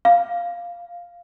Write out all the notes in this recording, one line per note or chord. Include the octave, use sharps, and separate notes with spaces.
F5